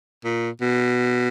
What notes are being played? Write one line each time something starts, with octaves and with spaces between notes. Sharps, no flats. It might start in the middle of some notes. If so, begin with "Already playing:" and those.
A#2
B2